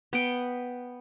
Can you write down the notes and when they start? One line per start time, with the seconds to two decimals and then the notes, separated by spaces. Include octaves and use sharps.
0.13 B3 G5